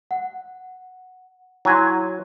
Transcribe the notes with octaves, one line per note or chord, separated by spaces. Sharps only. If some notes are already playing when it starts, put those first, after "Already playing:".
F#5
F#3 E4 G#5 C6